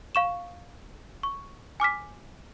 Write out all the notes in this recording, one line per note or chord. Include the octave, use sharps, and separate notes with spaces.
F5 C#6 E7
C#6
G#5 D6 F6 B6